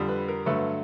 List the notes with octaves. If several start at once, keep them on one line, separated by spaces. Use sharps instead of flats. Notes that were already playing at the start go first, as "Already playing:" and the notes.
Already playing: F2 D3 G3
B4
A#4
G2 D3 F#3 A3 B4